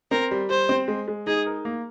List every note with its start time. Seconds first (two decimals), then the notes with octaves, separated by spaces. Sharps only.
0.11 C4 A#4
0.31 G3
0.50 G3 C5
0.69 C4
0.88 G#3
1.08 G#3
1.27 D#4 G#4
1.46 A#4
1.65 A#3